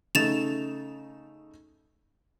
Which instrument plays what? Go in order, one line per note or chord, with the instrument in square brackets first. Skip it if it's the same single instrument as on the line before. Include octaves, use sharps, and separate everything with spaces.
[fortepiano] C#3 A3 D#4 [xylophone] A6 E7 F7